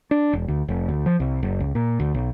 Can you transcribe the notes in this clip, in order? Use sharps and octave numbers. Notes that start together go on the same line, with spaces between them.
D4
E1
D2
F1
D2
F3
C2
F#1
C#2
A#2
D2
B1